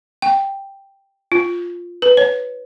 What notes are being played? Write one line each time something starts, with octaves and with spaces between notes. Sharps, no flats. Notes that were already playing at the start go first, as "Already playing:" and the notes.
G5
F4
B4
C#5